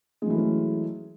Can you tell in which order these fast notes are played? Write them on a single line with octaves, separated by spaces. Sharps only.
G#3 F#3 E3 A3 C#4